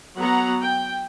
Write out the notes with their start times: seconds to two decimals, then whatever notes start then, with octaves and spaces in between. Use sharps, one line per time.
0.17 F#3 B3 F#5 A#5
0.61 G5